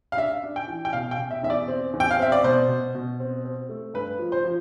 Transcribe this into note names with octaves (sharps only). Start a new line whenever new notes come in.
F5
D4 E5
D4
G5
E3
G5
B2 F5
G5
B2
E5
E2 E5
D5
C4
E2
G5
F5
C4 E5
D5
B2 C5
B2
B2
C4
C4
A3
G2 B4
F3
C5
F3